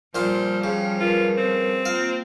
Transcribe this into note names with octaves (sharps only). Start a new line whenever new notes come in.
A#2 F3 G3 F4 C5
C#3 G5
F4 A#4 B4
C4
A#3 F4 F5